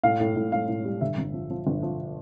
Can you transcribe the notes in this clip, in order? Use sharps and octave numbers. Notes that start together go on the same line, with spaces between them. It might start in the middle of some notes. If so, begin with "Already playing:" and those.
A2 F5
A2
A2
A2 F5
A2
G3
G1 E5
G1
F3
F3
G1
F3